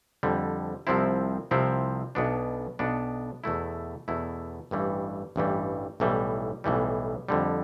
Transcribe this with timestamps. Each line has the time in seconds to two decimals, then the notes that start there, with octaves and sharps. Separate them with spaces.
0.23 F2 D3 G3
0.87 C2 C3 F3 C4 E4
1.51 C2 C3 F3 C4 E4
2.15 B1 B2 B3 D4
2.79 B1 B2 B3 D4
3.44 E2 B2 A3 E4
4.08 E2 B2 A3 E4
4.71 A1 G2 E3 G3
5.36 A1 G2 E3 G3
6.00 B1 A2 E3 G3
6.64 B1 A2 E3 G3
7.29 F2 D3 G3